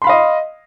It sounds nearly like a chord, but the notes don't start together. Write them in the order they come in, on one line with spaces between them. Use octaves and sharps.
C6 B5 F5 D#5